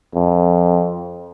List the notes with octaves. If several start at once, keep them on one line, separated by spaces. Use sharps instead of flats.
F2